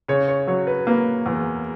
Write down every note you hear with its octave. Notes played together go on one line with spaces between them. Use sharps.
C#3 C#5
C#5
F#3 C#5
B4
A#3 B4
E2